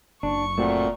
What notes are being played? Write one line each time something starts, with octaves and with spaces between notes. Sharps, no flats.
F#1 D4 C#6
A#2 A3 C4 F#4